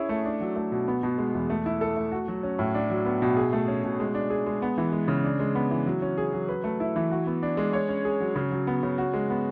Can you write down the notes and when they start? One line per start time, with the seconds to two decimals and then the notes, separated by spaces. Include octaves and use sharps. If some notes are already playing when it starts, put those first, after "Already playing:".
Already playing: C#4 E4 G#4
0.09 A3
0.25 D4
0.41 F#3
0.56 A3
0.72 B2
0.88 B3
1.03 B2
1.18 G#3
1.34 E2
1.50 A3
1.66 E4
1.81 A4
1.97 A3
2.12 F#4
2.28 F#3
2.43 C#4
2.59 A2
2.75 D4
2.90 F#3
3.06 B3
3.22 B2
3.37 G#4
3.53 A3
3.68 C#4
3.84 B2
4.00 G#3
4.15 D4
4.30 G#4
4.46 G#3
4.62 B3
4.78 E3
4.92 G#3
5.08 C#3
5.24 D4
5.40 G#3
5.55 B3
5.71 E3
5.86 F#3
6.02 C#4
6.18 G#4
6.33 F#3
6.49 B4
6.64 A3
6.80 E4
6.96 E3
7.11 F#4
7.27 B3
7.43 D4
7.57 G#3
7.73 C#5
7.89 C#4
8.05 G#4
8.20 F#3
8.36 C#3
8.51 F#3
8.67 B3
8.83 C#3
8.98 F#4
9.14 G#3
9.30 B3